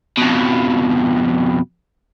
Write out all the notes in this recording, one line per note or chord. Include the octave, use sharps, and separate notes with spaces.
F2 B2